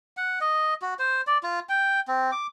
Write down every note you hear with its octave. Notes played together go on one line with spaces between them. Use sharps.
F#5
D#5
F#4
C5
D5
F4
G5
C4
D6